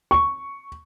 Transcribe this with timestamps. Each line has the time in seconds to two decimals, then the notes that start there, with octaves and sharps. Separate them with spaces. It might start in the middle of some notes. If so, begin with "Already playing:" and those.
0.11 C#6